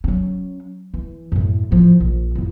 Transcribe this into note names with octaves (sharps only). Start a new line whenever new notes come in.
F#3 C#4
E3
F#2 A2
A2 F3
A#1
A1 F2